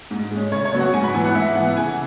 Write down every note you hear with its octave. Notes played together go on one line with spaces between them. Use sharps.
G#2
G#3
C#4
C#3 C#5
C#5
F#3 B3
F#5
G#2 G#5
B5
E3 B3 G#5
F#5
G#2 E5
B3 F#5
E3
C#3 G#5